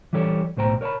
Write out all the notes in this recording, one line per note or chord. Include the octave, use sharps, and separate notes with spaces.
E3 G3 G4 A4 C#5
B1 A2 C5 G5 A#5
A#4 C#5 E5 A5 B5